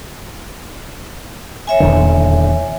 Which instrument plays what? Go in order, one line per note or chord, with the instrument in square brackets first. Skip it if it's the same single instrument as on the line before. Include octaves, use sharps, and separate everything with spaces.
[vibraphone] C#5 E5 G#5
[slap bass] D#1 E2 D3